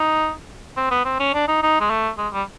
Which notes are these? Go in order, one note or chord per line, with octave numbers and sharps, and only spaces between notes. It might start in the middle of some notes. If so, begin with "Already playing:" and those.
Already playing: D#4
C4
B3
C4
C#4
D4
D#4
D#4
G#3
A3
G#3
G3